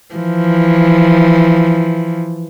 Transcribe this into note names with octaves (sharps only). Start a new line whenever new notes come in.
E3 F3